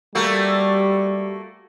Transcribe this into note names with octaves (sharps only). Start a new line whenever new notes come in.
G3 A3 A#3 F#4